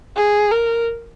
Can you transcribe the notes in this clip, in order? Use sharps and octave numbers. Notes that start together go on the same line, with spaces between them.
G#4
A#4